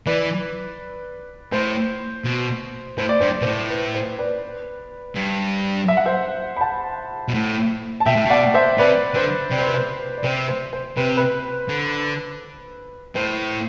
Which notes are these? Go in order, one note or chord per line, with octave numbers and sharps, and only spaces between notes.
E3 B4 D5
A2 C5
B2
A2 C5
D5
G2 C5
D5
B2 C5
A2
B4
C5
B4 D5
G2
E5
F#5
C5 E5
B5
F#5 A5
B2
A2
A5
B2 E5 G5
A2
B2
D5 F#5
C5 E5
C3 B4 D5
D3 C5
C3 D5
C5
B4
C5
D5
C3 C5
C5
C5
C3 B4
B4
D3
A2 C5